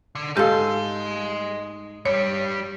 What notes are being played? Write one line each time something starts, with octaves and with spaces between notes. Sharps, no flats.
D3
G#2 G4 A4 D#5 F5 C6
G2 G3 C#5